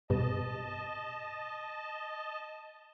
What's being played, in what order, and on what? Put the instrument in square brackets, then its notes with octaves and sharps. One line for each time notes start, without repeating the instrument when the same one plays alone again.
[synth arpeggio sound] G2 B2 [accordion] D#5 A5